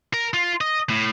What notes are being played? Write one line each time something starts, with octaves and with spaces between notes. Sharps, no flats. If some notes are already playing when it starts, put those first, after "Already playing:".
A#4
F4
D#5
A2